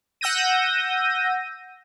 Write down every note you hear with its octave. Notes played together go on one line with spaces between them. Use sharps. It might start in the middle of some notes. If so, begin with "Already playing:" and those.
F#5 E6 G6 A#6 D#7